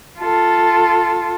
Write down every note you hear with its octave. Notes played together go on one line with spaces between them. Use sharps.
F4 A4